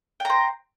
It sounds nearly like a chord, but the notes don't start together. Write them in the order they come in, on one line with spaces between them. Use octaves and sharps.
G5 A#5 C5